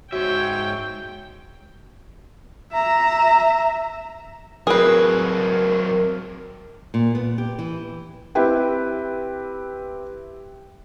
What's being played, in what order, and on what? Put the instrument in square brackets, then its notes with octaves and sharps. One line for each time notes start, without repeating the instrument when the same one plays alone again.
[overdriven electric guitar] G#2 E5 [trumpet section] C4 C#5 [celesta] F#4 [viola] G5
[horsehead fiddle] E5 A#5
[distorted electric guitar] F#3 C4 [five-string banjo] G#4 B4 [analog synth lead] A#4
[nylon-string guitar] A#2
B3
G4
E3
[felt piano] C4 E4 G4 B4 G5